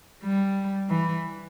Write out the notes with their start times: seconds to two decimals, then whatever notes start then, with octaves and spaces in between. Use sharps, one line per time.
0.23 G3
0.90 E3